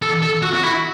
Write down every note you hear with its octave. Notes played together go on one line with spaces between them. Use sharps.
A4
A4
F#4
F#4
E4